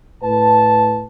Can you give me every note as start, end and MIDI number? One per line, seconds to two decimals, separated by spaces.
0.23 1.06 45
0.23 1.06 71
0.23 1.06 81